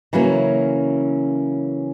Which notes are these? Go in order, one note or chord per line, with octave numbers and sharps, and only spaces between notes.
C#3 E3 F#3 A#3 C#4